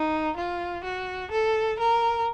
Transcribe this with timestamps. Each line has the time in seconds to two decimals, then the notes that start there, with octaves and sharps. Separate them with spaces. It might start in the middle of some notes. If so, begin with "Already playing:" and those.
Already playing: D#4
0.37 F4
0.85 F#4
1.32 A4
1.79 A#4